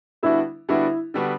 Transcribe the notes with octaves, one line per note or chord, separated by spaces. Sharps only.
D3 G3 B3 D4 E4 F#4
D3 G3 B3 D4 E4 F#4
D3 G3 B3 D4 F#4